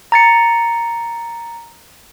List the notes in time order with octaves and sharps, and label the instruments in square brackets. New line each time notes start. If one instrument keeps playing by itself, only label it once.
[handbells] A#5 A6 C#7